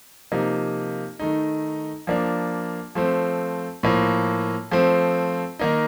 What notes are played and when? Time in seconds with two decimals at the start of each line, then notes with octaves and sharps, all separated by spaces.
0.32 C3 F3 A#3 D#4
1.19 D#3 A3 D#4
2.07 F3 A#3 D4
2.95 F3 A3 C4
3.83 A2 F3 A#3
4.71 F3 A3 C4
5.59 D#3 A#3 D#4